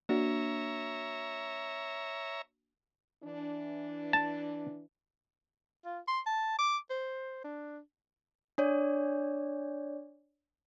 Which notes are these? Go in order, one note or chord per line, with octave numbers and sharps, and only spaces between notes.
A#3 D4 F#4 C#5 E5 A#5
E3 D4
A5
F4
C6
A5
D6
C5
D4
D4 C#5 D5